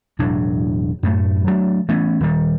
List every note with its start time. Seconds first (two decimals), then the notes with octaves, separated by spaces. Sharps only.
0.19 E1 A2 F#3 D4
1.03 F#2 A2 A3
1.47 F#3 A3 D4
1.88 E3 A3 B3 C#4
2.20 D#1 D#3 G3